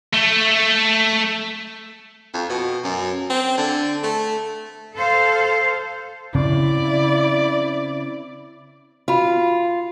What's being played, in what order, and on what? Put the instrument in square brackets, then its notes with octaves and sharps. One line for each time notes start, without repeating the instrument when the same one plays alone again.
[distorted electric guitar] A3
[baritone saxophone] F2
B2
F#2
C4
D3
A3
[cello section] A4 C5 F5
[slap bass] C#3 C4 [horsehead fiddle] E4 D5
[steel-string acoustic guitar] F4 [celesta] F#4 B5